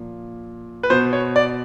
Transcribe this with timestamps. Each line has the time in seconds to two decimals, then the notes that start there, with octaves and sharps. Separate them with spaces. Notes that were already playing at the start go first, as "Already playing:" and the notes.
Already playing: A#2 F3
0.83 B4
0.90 B2 C5
1.13 C#5
1.36 D5